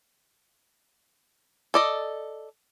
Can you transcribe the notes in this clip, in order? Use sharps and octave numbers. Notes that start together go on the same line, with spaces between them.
A4 D5 D#5